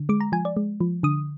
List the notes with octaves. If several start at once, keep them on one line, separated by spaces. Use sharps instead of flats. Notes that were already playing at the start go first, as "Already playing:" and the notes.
Already playing: D3
G#3 D6
A#5
F3 G#5
D5
G#3
F3
D3 D#6